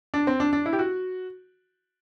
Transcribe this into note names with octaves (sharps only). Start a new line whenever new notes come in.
D4
C4
D4
D4
E4
G4
F#4